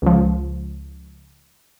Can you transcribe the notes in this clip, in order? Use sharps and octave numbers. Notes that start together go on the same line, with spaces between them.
C#2 F3